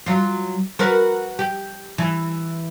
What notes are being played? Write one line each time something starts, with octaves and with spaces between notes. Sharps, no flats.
F#3 F4
F#4 A#4 B4
G4
E3